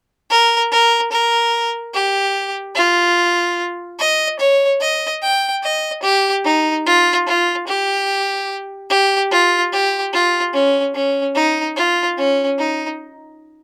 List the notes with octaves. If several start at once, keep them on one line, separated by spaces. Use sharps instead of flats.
A#4
A#4
A#4
G4
F4
D#5
C#5
D#5
G5
D#5
G4
D#4
F4
F4
G4
G4
F4
G4
F4
C#4
C#4
D#4
F4
C#4
D#4